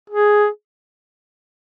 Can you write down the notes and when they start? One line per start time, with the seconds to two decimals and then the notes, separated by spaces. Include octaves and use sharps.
0.10 G#4